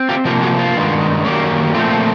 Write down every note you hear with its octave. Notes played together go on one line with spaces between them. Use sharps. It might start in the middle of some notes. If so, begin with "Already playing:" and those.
Already playing: C4
F4 G4
C3 F3 A#3 F4 G4
F#4 G#4
F4
G2 D#3 G#3 B3
F#2 D#3 G3 A#3 C#4
A#2 F3 A3 C4 F4
F4